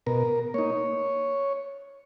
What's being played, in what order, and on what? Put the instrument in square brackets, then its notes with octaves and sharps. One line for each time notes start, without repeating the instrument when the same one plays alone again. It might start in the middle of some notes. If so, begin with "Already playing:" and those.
[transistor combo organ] B2 A#4
A#3 D#4 C#5